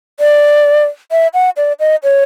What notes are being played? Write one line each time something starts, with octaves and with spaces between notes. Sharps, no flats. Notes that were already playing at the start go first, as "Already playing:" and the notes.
D5
E5
F#5
D5
D#5
C#5